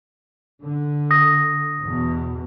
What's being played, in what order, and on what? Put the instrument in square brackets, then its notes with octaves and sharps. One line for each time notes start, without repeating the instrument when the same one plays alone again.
[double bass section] D3
[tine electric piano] D#6 A#6
[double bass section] E2 B2